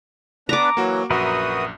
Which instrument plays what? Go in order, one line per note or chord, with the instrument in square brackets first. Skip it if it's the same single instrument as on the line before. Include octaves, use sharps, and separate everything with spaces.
[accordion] B3 D4 B4 [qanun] A#5 D6
[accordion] E3 F#3 [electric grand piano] A#3 F#4
[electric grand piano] A#1 F#2 [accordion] F#4 D#6 [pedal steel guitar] A#4 B4 E5